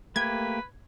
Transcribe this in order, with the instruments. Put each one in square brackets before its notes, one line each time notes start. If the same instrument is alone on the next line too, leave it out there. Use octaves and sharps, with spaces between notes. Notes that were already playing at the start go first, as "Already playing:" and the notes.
[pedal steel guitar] A3 A#3 G4 [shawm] B4 [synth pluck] G#6